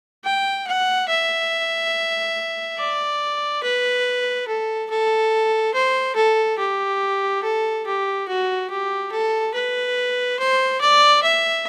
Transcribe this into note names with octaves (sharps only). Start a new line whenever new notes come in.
G5
F#5
E5
D5
B4
A4
A4
C5
A4
G4
A4
G4
F#4
G4
A4
B4
C5
D5
E5